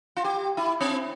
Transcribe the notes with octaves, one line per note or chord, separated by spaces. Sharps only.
F4
G4
E4
C4